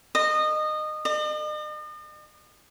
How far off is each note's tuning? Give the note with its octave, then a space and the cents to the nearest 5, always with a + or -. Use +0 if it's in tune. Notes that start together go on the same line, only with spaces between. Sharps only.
D#5 -20
D#5 -45